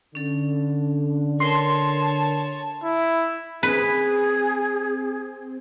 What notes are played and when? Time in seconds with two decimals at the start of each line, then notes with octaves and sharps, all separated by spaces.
0.15 D3 C#4 A4
1.40 A#4 C#5 A5 C6
2.84 E4
3.63 C4 G#4 B4